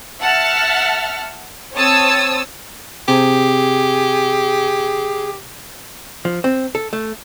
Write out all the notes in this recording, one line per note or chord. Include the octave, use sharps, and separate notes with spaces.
E5 F#5 A5 F6
C4 C5 C#5 A5 D#6 E6
C3 G4 G#4
F3
C4
A4
A3